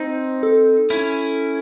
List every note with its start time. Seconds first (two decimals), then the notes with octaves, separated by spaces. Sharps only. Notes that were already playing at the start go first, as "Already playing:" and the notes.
Already playing: C4 D#4 C5
0.43 A4
0.90 C#4 E4